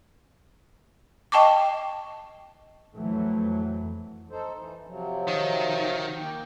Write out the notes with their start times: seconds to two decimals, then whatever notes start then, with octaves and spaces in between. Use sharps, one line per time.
1.32 D#5 G5 A5 C#6 D6
2.96 F2 E3 F#3 A3
4.31 D#4 A4 C5
4.56 E3
4.87 C3 F3 F#3
5.28 D#3
6.18 A#3 G5